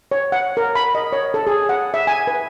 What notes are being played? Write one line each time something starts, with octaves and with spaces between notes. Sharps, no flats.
C#5
F#5
A#4
B5
D#5
C#5
A4
G#4
F#5
E5
G#5
B4